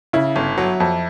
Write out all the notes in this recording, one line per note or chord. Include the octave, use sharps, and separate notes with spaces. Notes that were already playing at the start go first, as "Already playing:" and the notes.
C#3 E4
G1
F#3
F2